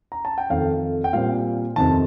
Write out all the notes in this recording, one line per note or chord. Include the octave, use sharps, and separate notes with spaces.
A#5
A5
G5
F2 D#3 A3 C4 F5
G5
A#2 G3 C4 F5
F2 C3 D#3 A5